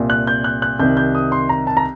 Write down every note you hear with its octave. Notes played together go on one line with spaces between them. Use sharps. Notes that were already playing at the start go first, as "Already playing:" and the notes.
Already playing: C2 A#2
F#6
G6
F#6
F#6
C2 C3 D#3 G6
G6
D#6
C6
A#5
A5
A#5